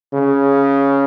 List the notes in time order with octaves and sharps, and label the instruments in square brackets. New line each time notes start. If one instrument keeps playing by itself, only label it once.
[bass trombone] C#3